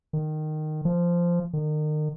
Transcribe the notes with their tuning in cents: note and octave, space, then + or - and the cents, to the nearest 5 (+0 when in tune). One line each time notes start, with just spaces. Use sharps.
D#3 -15
F3 -10
D#3 -35